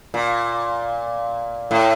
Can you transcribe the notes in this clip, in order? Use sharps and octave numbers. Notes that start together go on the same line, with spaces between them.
A#2
A2